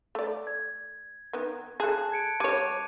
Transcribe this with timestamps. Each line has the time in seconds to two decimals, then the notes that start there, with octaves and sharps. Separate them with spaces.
0.15 A3 D5
0.47 G#6
1.33 D#3 B3
1.80 G#4 A4 A5 F#6
2.12 G#6 C#7 D7
2.40 G3 C#5 D6 G#6 D#7